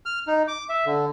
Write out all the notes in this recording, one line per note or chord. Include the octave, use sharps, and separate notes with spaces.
F6
D#4
D6
E5
D3